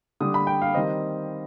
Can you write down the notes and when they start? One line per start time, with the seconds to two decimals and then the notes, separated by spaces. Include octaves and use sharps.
0.20 D3 G3 D4 D#6
0.34 B5
0.47 G5
0.62 F5
0.74 D#3 G3 C4 D#5